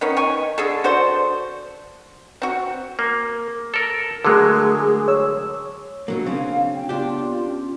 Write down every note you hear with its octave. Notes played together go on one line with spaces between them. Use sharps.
D#3 B3 C#4
D#4 G5 G#5 C#6
D3 G#4 A4
D4 F#4 A4 C5
C4 F#4
A#3
A4 A#4
D3 F#3 G#3 A3 G#4 A#4
C#5 E6
B2 F#3 A#3 D4
C#3 C4 C#4 F5
G5
B3 D4 F4 G4
C#4